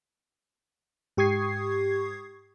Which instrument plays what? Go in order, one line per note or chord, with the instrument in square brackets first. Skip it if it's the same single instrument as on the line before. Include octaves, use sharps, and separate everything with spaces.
[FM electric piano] G#2 G4 C#6 D#6 G#6 C7